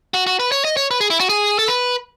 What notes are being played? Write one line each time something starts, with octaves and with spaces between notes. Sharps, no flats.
F#4
F#4
B4
C#5
D#5
C#5
B4
G#4
E4
F#4
G#4
A4
B4